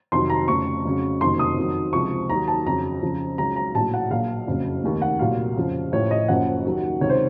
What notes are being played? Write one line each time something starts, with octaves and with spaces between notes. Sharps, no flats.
F2 C3 D#3 F#3 C6
A#5
F1 F2 C#3 C#6
F2 C#3 F#3
F#1 F2 C3 D#3 F#3 C6
D#6
F2 D#3 F#3
C#2 C3 F3 C#6
D#2 D#3 F#3 A#5
A5
F2 C#3 F#3 A#5
F2 C#3 F3
C#2 C#3 F#3 A#5
A#5
A#1 A2 F#3 A5
F#5
A#1 A#2 F#3 F5
F#1 F2 C#3 F#3
F1 D#2 D#3
F#5
C2 A#2 F#3 F5
F2 C#3 F3
A1 A2 F3 C#5
D#5
F#1 F#2 C#3 F3 F#5
D#2 D#3 F#3
C#2 C3 D#3 C#5
C5